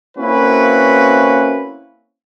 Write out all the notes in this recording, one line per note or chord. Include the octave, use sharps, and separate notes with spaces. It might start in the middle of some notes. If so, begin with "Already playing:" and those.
A#3 C4 C#4 E4 F#4 B4